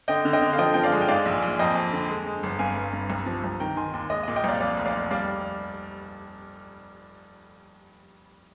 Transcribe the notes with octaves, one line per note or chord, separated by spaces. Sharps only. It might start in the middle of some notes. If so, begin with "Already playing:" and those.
D3 D#5 G5
D3
D#5 G5
D3
F5
F3 D#5 G5
F3 G5
D5 F5
G#3
G5
G#2 D5 F5
A#1
A#1
F2 D#5 G5
F2
D3
G#3
G#3
G1
G2 F5 G#5
G2
G2
C2
F3
C2
D#3 G5 A#5
D#3 G#5 C6
D#2
G#3 D#5
D#5
A#2
D#5 G5
C2 D5 F5
F2 D5 F5
F1
D5 F5
F1
G3 D5 F5